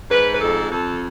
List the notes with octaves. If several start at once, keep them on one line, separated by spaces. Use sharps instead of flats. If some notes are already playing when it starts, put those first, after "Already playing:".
G#2 B4
B4
F2 A4
F2 A4